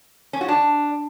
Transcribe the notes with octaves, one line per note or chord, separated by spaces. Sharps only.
C#4
F#4
D4